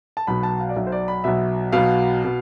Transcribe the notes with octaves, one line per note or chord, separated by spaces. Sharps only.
A5
B1 B2 B5
A5
F5
D5
B1 B2 E5
C5
D5
B5
B1 B2 E5
B1 B2 F5
B2